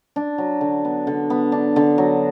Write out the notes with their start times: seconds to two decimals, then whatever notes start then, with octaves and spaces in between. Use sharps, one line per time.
0.16 D4
0.38 F#3
0.61 D3
0.85 B3
1.07 D3
1.30 B3
1.52 D4
1.76 D3
1.98 F#3